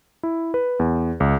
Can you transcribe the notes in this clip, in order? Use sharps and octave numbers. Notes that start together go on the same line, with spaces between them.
E4
B4
E2
C#2